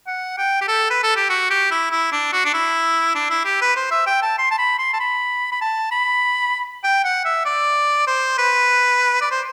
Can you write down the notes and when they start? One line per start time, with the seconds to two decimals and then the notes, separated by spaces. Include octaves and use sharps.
0.07 F#5
0.38 G5
0.61 G4
0.68 A4
0.90 B4
1.03 A4
1.17 G4
1.30 F#4
1.50 G4
1.71 E4
1.91 E4
2.12 D4
2.33 F#4
2.45 D4
2.54 E4
3.15 D4
3.30 E4
3.45 G4
3.61 B4
3.76 C5
3.91 E5
4.07 G5
4.22 A5
4.38 C6
4.51 A5
4.58 B5
4.79 C6
4.93 A5
5.00 B5
5.52 B5
5.61 A5
5.91 B5
6.84 G5
7.04 F#5
7.25 E5
7.45 D5
8.07 C5
8.38 B4
9.22 D5
9.31 C5